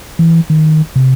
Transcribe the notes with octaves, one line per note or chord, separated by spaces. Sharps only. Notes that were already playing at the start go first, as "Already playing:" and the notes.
E3
D#3
C3